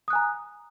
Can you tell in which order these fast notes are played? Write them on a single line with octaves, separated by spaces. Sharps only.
D#6 F#6 G#5 A#5